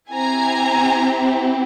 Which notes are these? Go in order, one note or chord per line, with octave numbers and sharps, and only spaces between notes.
C4 E4 G4 G#5 A#5